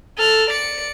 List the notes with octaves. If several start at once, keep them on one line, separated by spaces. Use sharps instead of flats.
A4 F6
D5 C#7